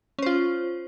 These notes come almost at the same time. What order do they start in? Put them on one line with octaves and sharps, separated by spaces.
C#4 C5 F4